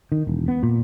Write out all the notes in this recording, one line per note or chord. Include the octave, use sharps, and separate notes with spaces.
D#3
E1
B3
A#2